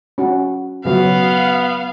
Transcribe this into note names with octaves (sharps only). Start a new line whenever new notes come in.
C#4 F#4
C#3 F#3 B3 F5